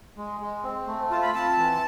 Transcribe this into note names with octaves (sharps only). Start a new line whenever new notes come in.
G#3
G#3
C4
A3
F4 A5
B5
C4 A5
E3